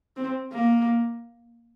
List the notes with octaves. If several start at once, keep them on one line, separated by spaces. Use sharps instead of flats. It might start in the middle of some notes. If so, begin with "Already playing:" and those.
C4
A#3